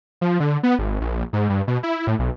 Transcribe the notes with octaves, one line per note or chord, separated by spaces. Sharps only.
F3
D3
B3
G#1
A#1
G#2
G2
B2
E4
A2
B1